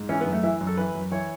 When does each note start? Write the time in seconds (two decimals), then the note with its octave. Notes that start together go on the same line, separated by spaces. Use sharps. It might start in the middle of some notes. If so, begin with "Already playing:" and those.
Already playing: G#2
0.09 E3 C#4
0.21 B3
0.26 F#2
0.33 A3
0.43 E3 E4
0.61 F#2
0.67 A4
0.77 E3 B4
0.95 F#2
1.11 E3 C#5